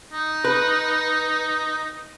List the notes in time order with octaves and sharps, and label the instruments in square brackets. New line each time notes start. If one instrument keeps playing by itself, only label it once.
[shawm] D#4
[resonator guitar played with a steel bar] B4